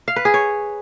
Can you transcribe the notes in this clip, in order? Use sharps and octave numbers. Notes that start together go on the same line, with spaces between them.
F5
B4
G#4
C#5